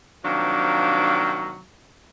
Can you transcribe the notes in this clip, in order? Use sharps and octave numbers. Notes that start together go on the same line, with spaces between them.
C3 D#3 F3 F#3 A#3 D4